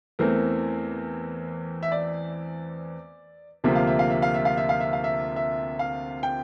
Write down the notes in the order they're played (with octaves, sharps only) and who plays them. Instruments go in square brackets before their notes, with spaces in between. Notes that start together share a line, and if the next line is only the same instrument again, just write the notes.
[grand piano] E2 E3 A3 C4 A#4
E5
D5
D2 C3 F3 A#3 E5
F5
E5
F5
E5
F5
E5
F5
E5
F5
E5
F5
E5
E5
F5
G5